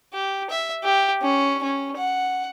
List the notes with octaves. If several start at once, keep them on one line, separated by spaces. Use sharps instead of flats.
G4
E5
G4
C#4
C#4
F#5